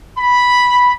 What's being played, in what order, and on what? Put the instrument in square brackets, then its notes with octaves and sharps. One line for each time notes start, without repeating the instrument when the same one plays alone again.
[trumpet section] B5